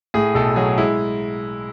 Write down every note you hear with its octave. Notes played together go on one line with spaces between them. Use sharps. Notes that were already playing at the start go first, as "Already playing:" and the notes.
A2 G#4
B1 A4
F#3 G#4
G#3 E4